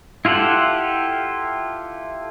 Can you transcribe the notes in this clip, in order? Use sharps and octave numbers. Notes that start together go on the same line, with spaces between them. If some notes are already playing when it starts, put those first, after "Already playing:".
E4 F4 G4 A4 F#5